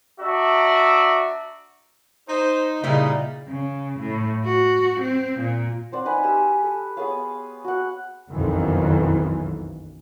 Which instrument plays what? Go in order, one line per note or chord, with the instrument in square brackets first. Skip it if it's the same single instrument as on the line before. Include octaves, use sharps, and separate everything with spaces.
[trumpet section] D4 F#4 D5 E5 A#5
[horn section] D#4 [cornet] C5
[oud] A#2 G3 E4 [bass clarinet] C#3 [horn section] D#4 [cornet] F5
[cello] C#3
A2
F#4
C4
A#2
[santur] C4 C5 D5 F#5
D#4 B4 F#5 G#5
G4 G#5 E6
A4
B3 G#4 C#5 F5
F#4 F#5
[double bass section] F#1 B1 F2 D#3 E3 F#3